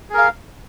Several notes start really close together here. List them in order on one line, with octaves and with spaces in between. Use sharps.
G#4 A#4 F5